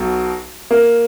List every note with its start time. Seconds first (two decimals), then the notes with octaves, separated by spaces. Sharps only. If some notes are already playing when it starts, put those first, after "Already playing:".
Already playing: B1 B2 F#3
0.71 A#3